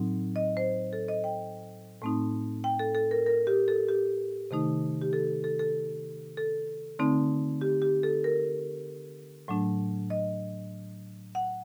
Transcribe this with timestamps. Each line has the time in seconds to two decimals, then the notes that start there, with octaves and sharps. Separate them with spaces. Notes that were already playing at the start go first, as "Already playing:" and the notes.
Already playing: A2 F#3 C4 D#4
0.36 D#5
0.57 C5
0.93 A4
1.08 D#5
1.24 G5
2.02 A2 A3 C4 D#4
2.64 G5
2.79 A4
2.95 A4
3.11 A#4
3.26 A#4
3.47 G4
3.68 A4
3.89 G4
4.51 C3 D#3 A3 D#4
5.01 G4
5.13 A4
5.44 A4
5.59 A4
6.37 A4
6.99 D3 A3 C4 D#4
7.61 G4
7.82 G4
8.03 A4
8.24 A#4
9.48 A2 F#3 A3 D4
10.10 D#5
11.35 F#5